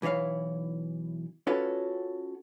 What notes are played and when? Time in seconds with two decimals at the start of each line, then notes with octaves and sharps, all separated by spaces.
0.02 B1 E3 E4 C#5 F5
1.47 C#4 F4 F#4 A4 B4 C#5